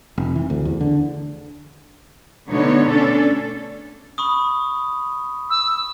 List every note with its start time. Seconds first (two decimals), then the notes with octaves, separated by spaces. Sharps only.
0.18 F1
0.35 E3
0.50 D2
0.65 E2
0.81 D3
2.49 B2 D3 A3 B3 D#4 C#5
2.89 C#4 D4 A4
4.18 B5 C#6 D#6
5.50 E6